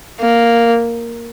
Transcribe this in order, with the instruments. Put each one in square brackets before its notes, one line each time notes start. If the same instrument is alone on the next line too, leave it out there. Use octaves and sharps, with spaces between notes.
[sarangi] A#3